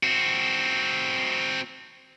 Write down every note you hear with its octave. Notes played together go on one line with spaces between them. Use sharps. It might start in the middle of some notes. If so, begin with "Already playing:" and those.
C4 F#4